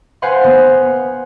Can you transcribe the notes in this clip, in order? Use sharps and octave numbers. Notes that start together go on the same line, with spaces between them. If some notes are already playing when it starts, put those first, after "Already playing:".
B4 C5 F5 F#5 G#5 C6
B3